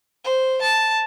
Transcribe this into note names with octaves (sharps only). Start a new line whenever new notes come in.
C5
A5